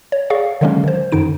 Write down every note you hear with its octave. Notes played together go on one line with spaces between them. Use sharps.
C#5
G#4 D5 F5 C#6
D3 D#3 F#3 G#3 A#3 C#4
D#3 C5
F#2 D3 D#3 D#4 D7